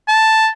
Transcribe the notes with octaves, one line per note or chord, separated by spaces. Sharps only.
A5